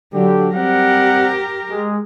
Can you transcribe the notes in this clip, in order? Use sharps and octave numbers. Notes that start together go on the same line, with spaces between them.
D3 F#3 G4
G3 C4 G4 A#4 F#5
G#3